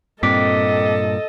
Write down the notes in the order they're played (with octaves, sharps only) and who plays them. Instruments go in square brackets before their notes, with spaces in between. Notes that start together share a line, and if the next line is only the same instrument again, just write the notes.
[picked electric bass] G2 A#2 [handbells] C4 D6 B6 [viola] A4 D#5